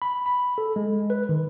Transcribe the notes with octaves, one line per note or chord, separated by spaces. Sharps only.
B5
B5
A4
G#3
B4
D#3